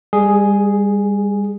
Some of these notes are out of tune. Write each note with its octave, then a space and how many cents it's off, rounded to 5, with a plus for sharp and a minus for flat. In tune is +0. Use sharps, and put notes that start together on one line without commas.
G3 +35 G#4 +0